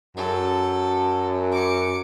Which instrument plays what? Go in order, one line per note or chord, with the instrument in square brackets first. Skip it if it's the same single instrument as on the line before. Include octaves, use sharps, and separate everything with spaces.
[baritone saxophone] F#2 [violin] A4
[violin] D6 C#7